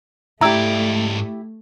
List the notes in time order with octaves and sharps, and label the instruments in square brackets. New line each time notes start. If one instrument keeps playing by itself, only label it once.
[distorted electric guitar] G#2 D5 [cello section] A3 [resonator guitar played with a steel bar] E4 G4 [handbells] A#5 E6